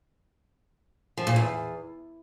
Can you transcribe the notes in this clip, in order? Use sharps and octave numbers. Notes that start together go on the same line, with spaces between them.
F3
A#2
E2